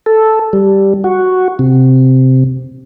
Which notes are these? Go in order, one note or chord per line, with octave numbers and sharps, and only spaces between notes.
A4
G3
F#4
C3